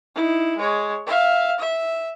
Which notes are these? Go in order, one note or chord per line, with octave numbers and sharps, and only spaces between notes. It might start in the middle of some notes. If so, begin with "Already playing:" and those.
D#4 E4
G#3 C#5
E5 F5
E5